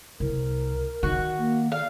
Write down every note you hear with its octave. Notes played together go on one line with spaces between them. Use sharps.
C2 A#4
D#3 F#4
A#3
D5 F5